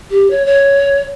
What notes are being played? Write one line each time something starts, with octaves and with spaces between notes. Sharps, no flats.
G4
C#5
C#5